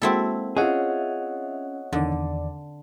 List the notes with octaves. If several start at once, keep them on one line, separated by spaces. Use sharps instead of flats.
G#3 A#3 C4 E4 F#4 A4
C#4 F4 G#4 C#5 D#5 E5 F#5
E2 D3 D#3 D5